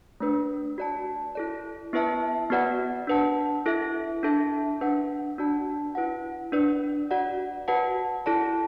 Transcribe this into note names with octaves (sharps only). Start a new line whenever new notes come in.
A3 D4 B4
F#4 D5 A5
E4 A4 D5
B3 E4 B4 E5 A5
B3 F#4 B4 D5 F#5
D4 B4 F#5 A5
E4 A4 E5
D4 A4 E5 A5
D4 B4 F#5
D4 F#4 D5 A5
E4 B4 F#5
D4 B4 D5
F#4 D5 F#5
F#4 B4 F#5 A5
E4 A4 D5 A5